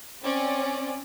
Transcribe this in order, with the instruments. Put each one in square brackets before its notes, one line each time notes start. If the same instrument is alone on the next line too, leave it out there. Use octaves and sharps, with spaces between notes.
[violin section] C4 C#4 D5